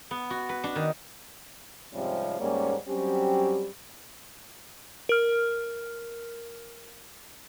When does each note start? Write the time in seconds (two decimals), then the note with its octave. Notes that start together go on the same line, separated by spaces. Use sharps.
0.11 B3
0.30 F#4
0.49 B4
0.64 D4
0.76 D#3
1.93 G#2 C3 F3 G3 C4 C#4
2.40 D#2 G#2 G3 A#3 C#4
2.88 F#3 G3 C4 C#4 G4
5.09 A#4 F6